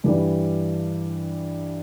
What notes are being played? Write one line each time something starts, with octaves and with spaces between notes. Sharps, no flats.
G2 E3 G3